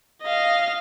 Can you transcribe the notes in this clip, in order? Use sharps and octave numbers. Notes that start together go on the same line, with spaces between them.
D#5 F5